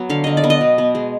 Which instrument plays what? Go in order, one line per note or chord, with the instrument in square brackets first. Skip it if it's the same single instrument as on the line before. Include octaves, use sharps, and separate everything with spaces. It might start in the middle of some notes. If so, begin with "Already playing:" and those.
Already playing: [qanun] F#3 B3
D3 F5
D3 D#5
D5
B3
D#5
B2
B3
G#3